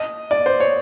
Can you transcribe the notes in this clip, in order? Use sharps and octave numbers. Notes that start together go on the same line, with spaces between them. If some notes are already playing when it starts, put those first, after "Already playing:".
Already playing: D#5
D5
C5
C#5